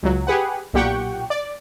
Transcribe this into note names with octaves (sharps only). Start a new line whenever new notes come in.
C#2 F#3
G4 G#4 B4 F#5
B1 A#2 G4 F#5 G5 C#6
D5